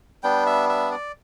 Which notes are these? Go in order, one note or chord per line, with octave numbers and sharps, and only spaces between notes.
G3 B3 D4 G5
E5
E5
D5